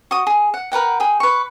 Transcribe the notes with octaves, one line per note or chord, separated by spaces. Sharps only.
F#4 D#6
G#4
F#5
A#4 B4 F#5 G5
G#4 G5
B4 C#6